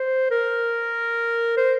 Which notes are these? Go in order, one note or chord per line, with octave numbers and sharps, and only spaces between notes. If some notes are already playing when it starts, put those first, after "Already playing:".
Already playing: C5
A#4
C5